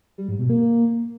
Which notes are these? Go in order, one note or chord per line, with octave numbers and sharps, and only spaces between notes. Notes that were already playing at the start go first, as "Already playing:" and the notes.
G3
G#2
B2
A#3